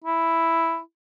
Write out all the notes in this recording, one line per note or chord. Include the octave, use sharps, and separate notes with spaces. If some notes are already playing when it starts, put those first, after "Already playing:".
E4